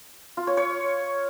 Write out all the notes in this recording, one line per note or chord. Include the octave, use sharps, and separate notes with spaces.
F4
C#5
C#5